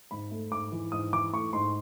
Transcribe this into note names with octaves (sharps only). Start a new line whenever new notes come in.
G#2 B5
A3
G#2 D6
E3
G#2 D#6
E3 D6
A3 C#6
G#2 C6